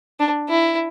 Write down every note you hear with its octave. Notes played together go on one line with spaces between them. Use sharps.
D4
E4